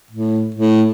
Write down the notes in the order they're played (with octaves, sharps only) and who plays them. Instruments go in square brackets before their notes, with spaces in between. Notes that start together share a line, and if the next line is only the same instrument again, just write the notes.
[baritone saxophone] A2
A2